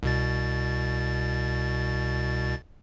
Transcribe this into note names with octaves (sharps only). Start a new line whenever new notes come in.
C2 B2 A6